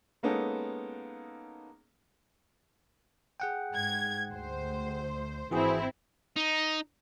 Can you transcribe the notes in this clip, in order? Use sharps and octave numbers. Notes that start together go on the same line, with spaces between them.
G#3 A#3 B3 C#4 D#4 A4
G#4 F#5 G5
G#2 G#6
D2 C5
G#1 E3 C4 E4 F#4 G#4
D#4